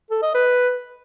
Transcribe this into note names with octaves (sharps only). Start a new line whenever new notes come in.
A4
D#5
B4